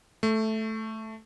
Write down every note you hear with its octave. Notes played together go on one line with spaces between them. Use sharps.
A3